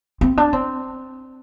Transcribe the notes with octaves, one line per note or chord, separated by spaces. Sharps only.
C4
D4
C4